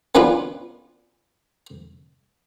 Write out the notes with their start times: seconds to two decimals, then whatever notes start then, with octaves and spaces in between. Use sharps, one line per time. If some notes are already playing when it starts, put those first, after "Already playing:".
0.15 B3 C#4 D4 F4 B4